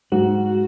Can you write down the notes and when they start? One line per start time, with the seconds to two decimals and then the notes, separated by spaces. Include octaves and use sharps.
0.12 G#2 F#4